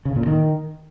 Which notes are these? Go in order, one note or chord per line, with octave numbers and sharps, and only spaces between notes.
C#3
A#2
D#3